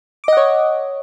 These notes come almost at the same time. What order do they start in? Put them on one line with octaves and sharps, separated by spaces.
D6 D#5 F#5 C#5